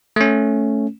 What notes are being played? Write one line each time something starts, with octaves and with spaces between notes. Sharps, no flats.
A3 C#4